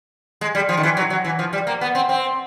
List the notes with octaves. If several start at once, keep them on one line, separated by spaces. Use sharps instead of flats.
G#3
G3
F3
D#3
E3
F#3
F#3
E3
F3
G3
A#3
B3
C4
C4